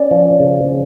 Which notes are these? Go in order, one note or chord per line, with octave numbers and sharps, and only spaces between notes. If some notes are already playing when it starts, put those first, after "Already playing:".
Already playing: C#4 D5
F3
C#3